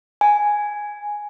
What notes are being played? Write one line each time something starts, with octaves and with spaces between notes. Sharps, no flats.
G#5